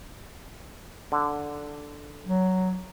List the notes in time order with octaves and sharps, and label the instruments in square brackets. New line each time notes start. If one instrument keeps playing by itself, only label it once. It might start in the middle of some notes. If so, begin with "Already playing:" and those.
[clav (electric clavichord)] D3
[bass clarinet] F#3